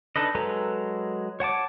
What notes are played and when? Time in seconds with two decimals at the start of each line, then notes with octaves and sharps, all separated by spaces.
0.16 D4 D#4 A4 B4 D#5
0.35 F#3 G#3 A4 B4 A#5
1.40 C#5 F#5 A5 D6